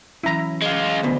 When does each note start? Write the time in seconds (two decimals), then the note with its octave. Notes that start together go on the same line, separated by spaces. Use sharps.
0.23 E3 F#3 C#4 E4 A#5
0.62 G#3 F4
1.03 D2 B2